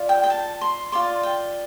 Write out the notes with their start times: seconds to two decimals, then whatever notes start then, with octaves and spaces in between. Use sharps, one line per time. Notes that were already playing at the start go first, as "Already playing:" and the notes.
Already playing: F4 D5
0.09 G5
0.24 G5
0.30 A5
0.61 C6
0.92 F4 D5 C6
1.23 G5